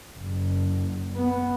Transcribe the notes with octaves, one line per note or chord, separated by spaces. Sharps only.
F#1
B3